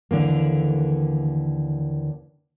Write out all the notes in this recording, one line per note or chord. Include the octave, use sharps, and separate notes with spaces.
D#2 D3 E3 A#3